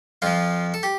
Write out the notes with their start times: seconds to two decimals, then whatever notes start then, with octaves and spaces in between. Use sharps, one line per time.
0.22 F2 F3 F4
0.74 A4
0.83 G4